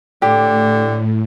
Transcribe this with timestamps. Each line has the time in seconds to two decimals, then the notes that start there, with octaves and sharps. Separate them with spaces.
0.22 A2 D3 G4